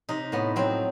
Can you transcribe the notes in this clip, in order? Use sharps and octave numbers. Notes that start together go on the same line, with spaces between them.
C3 D#4
A2 B3
F#3 C4